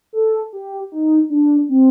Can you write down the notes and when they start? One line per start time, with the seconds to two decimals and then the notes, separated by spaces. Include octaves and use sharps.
0.13 A4
0.53 G4
0.92 D#4
1.30 D4
1.69 C4